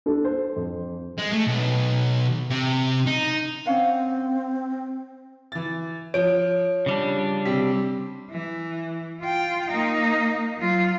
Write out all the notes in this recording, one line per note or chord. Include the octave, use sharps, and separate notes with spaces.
D4 A4
C5
F2
G#3
A3
B1
C3
D#4
C4 C#4 F5 F#5
E3 A6
F3 C#5 D7
C#3 G3 D4
C3 C4 B6
E3
F4 G5
A#3 D#4
F#3 F4